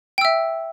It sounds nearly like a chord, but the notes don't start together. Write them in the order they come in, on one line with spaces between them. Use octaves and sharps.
G5 E6 E5